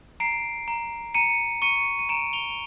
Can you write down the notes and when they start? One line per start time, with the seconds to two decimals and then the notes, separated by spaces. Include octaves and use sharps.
0.20 A#5 C7 D7
0.68 A#5
1.14 A#5 C#7 D#7
1.62 C#6 C#7 D#7
1.99 D#7
2.09 A#5 D7 E7
2.33 F7 G7